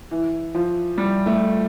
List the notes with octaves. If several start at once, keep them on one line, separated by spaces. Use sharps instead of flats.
E3
F3
G3
A3